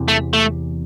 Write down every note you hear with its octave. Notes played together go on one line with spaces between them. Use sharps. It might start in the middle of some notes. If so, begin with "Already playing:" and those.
Already playing: E2 C3 E3
A3
A3